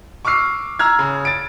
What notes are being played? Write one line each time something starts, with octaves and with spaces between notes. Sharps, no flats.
C#6 D6 E6 F6 C7
A#5 E6 F6 G#6
C#3
A6 D7